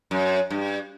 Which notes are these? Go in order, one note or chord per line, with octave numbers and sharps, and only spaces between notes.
F#2
G2